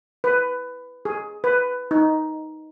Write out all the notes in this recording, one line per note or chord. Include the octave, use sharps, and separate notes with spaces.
B4
G#4
B4
D#4